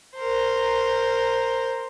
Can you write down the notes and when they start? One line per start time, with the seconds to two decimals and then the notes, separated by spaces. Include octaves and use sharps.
0.16 A#4 C5